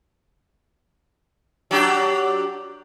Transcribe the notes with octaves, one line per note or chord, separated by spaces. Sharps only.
F#3 D4 G4